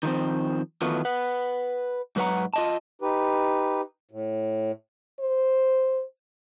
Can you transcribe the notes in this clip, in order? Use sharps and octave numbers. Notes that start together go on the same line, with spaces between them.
D#3 F3 C4
D#3 E3 F#3 A3 B3 F4
B4 F#5
G#2 F#3 B4 C#5 F#5 A#5
F4 D#5 A5
D#4 G4 B4
A2
C5